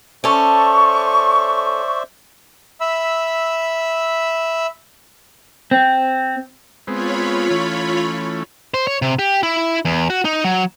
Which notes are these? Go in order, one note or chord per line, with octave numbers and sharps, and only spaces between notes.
C#4 A4 C5 D5 E5 C#6
E5 B5 E6
C4
G#3 B3 C4 F4 C#5 B5
E3 A3 C#4
C5
C#5
C3
G4
E4
E2
F#4
D#4
F#3